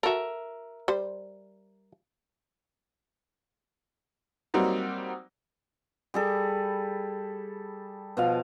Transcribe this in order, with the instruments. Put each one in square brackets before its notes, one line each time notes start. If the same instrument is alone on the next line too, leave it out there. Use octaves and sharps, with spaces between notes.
[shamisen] F#4 A4 [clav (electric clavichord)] A#4 E5
[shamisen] G3 C5
[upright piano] F#3 G3 A#3 C4 D#4 F#4
[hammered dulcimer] G3 G#4 A4
B2 F3 F5